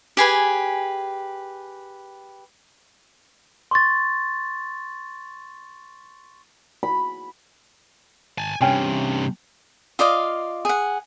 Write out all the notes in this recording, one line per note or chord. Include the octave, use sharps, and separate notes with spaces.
G4 G#4 B4 G#5
C6 C#6 A6
B5
G#5 A5
G2 C3 C#4 G5 G#5
F4 D5 D#5 F5
G#4 F#5